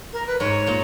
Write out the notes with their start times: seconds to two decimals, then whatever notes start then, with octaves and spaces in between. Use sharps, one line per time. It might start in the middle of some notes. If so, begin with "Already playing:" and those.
0.13 A#4
0.27 B4
0.39 G#2 C#5
0.67 A#2